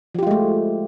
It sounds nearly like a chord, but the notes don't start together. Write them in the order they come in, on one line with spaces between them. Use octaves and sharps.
F3 G4 F4 G#3 A3